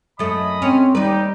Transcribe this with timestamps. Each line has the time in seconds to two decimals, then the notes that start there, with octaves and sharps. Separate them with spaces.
0.19 F#2 A3 D#5 B5 D#6
0.62 C4 C#4
0.95 D#2 G3 D#4 G4 B4